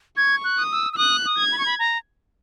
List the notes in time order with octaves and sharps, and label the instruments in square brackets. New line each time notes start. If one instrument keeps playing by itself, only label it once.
[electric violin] C#6 [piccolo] G#6
[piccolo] F#6
[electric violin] D#6
[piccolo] E6
E6
[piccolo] D#6 [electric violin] F#6
[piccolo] D#6
[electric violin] G#6
[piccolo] B5
C#6
B5
A#5